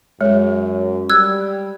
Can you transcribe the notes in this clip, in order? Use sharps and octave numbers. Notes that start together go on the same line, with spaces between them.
F#2 G#3 G#4 C#5
G3 E6 F#6 G#6